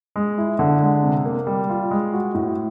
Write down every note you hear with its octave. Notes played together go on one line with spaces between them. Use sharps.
G#3
E4
D3
G#3
C3
A#3
G3
F4
G#3
F#4
A2